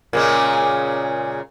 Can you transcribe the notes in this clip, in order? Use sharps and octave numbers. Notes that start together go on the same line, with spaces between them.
A#2 C#3 G#3